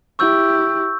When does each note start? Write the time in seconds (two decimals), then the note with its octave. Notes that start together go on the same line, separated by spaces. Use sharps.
0.19 E4 G4 C#6 E6 G6